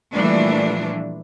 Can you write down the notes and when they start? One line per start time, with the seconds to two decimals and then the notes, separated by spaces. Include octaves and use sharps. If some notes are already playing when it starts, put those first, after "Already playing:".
0.12 A#2 E3 F3 G3 A3 D4